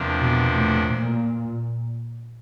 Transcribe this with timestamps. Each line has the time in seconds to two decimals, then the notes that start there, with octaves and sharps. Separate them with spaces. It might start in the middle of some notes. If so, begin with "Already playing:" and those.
Already playing: E2 C3 F3 A#3 D4
0.18 B2
0.55 A2
0.91 A#2